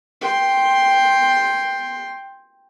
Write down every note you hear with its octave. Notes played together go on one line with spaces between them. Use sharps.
G5 C6